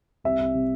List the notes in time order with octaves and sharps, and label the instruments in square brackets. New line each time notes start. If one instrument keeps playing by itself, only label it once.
[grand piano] C2 E5
C2
C3